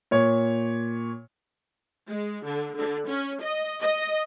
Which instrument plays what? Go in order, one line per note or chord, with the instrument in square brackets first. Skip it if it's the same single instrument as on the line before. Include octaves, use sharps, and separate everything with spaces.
[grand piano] A#2 C#5
[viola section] G#3
D3
D3
C#4
D#5
D#5